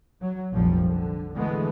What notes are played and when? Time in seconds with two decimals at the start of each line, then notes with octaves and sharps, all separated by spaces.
0.21 F#3
0.51 F1 A#1 A#2 F3 G3
0.89 D3
1.33 B2 D3 E3 G#3 A3 B3